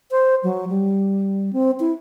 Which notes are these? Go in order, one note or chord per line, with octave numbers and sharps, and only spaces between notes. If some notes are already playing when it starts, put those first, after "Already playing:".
C5
F#3
G3
C4
E4